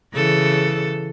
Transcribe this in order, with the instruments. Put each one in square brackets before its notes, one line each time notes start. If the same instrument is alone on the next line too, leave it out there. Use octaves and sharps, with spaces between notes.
[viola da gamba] C#3 E3 A4